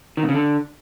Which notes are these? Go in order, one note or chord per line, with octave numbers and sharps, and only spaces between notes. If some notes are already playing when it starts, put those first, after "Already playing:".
D#3
B2
C#3
D3